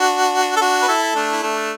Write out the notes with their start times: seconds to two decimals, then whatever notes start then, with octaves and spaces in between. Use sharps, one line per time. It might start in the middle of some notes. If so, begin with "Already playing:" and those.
Already playing: D4 F#4
0.57 A4
0.60 D4 F#4
0.82 B4
0.88 E4 A4
1.15 A3 D4
1.33 E4
1.43 A3 D4